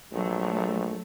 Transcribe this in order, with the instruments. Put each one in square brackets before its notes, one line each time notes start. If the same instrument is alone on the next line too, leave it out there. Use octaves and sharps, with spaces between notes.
[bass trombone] A#1 [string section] F#3 A3